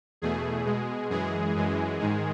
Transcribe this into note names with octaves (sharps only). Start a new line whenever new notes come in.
E2 B2 A3 G#4
B2 G#3
F#2 E3 G#3 G#4
F#2 E3 G#3
G#2 D#3 G#3